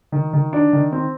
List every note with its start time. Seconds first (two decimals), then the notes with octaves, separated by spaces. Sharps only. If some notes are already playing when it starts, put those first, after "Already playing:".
0.12 D#3
0.33 D#3
0.53 D4
0.73 D#3
0.92 C4